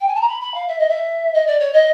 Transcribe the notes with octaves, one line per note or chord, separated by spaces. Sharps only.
G5
G#5
A5
A#5
B5
B5
F5
E5
D#5
E5
D#5
D5
C#5
D#5